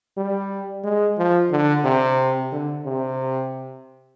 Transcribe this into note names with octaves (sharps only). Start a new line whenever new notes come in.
G3
G#3
F3
D3
C3
D3
C3